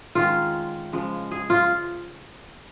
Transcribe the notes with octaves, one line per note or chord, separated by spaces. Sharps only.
D#3 G#3 C#4 F4
C#3 F3 G#3
G#4
F4